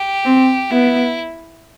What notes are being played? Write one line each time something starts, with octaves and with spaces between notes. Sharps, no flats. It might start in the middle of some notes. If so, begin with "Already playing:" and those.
Already playing: G4
C4
B3 E4